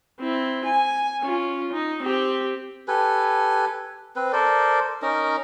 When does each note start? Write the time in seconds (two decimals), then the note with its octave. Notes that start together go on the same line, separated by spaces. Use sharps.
0.20 C4 E4
0.65 G#5
1.21 C#4 F4
1.73 D#4
2.02 C4 G4
2.88 G4 A4 B4 G#5
4.16 C4 B4
4.33 A4 A#4 C5 D5
5.02 C#4 D#4 A#4 A#5